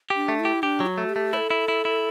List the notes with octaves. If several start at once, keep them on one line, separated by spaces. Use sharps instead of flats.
G4
D4
A3
E4
G4
D4 G4
F#3
F#4
A3
G4
A3
E4 A4 C#5
E4
E4
E4